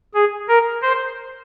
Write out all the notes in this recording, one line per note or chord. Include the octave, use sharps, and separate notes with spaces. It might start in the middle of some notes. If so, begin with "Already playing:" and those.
G#4
A#4
C5